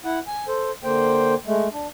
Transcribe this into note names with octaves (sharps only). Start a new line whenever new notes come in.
E4 F#5
G#5
A4 C5
D3 A#3 C5 G5
G#3 A3
D4